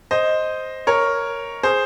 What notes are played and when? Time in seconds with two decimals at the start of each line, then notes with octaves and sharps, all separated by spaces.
0.11 C5 D#5
0.87 A#4 C#5
1.63 G#4 C5